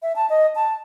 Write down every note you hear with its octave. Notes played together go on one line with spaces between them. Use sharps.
E5
A5
D#5
A5